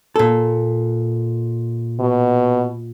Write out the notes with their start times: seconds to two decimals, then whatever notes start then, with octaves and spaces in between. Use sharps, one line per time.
0.16 A#2 A4
2.00 B2